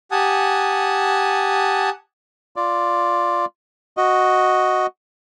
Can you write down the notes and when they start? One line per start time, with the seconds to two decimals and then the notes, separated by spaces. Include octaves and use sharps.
0.11 G4 F#5 G#5 A5 D#6
2.56 F4 D5
3.97 F#4 D#5